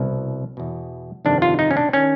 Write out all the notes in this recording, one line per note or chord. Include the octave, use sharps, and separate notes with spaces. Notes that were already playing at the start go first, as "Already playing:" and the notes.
Already playing: C2 B2
E2 B2
G1 F2 C3 D#3 D4
F4
D#4
C#4
D4
D#3 C#4